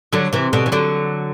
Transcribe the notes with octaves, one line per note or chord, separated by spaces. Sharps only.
D3 F#3
C3 E3
B2 D3
E3
D3 F#3